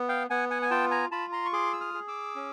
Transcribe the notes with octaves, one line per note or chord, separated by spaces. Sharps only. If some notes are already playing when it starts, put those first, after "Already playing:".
Already playing: B3
F5 G5
B3 F#5 G#5
F#5 G#5
G#5
F4 G5 A5
G#5 A#5
F4 A5 B5
A#5 C6
C#6
G#4 C6 D6
E6
D#6 F6
G#4
D6 E6
C#4